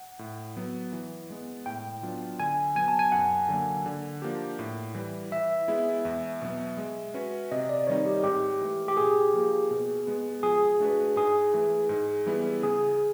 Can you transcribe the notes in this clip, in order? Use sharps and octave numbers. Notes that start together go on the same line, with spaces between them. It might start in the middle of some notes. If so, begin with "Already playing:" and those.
Already playing: F#5
A2
F#3 B3
E3
G#3 B3
A2 G5
F#3 B3 D4 F4
D3 G#5
F#3 B3 G#5
A5
G#5
F#2 F#5
D3 F#3 A#3
D3
F3 A#3 D4 G4
A2
E3 G3
E3 E5
G#3 B3 E4 G#4
E2
B2 F#3 B3
G#3
C#4 F#4 B4
C3 D#5
D5
D#3 G3 C4 D#4 C#5
G4
G#2 G4
E3 A3
G4
A#2 G#4
F3 A#3
B2
G#3 B3
F3 G#4
A3 D4 F#4 B4
G#2 G#4
E3 A3
G#2
E3 G3 B3 E4
C#3 G#4